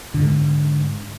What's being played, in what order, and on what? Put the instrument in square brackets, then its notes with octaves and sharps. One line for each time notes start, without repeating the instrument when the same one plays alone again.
[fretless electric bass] G#2 D3